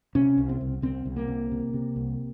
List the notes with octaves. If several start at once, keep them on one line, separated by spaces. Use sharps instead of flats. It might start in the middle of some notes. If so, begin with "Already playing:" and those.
C3 C#4
C2
C4
C2
C2 C4
C2
A#3
C3
C3
C3
C2